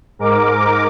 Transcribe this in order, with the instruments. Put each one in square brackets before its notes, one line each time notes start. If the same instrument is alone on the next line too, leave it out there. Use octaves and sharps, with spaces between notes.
[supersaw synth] G#2 A#4 D6